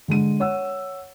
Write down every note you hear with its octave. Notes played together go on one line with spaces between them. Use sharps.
D3 G#3 D4 D#7
C#5 F#5 E6